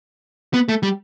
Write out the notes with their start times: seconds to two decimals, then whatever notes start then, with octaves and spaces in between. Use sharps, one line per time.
0.54 B3
0.69 A3
0.83 G3